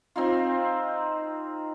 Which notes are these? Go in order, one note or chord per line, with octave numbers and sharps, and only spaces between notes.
C4 D#4 F4